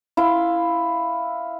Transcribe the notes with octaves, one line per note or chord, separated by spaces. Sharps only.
E4 F5 C6